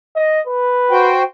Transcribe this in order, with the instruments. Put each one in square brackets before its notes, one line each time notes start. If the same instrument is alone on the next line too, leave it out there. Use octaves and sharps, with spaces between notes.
[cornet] D#5
B4
[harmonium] F#4 C5 G5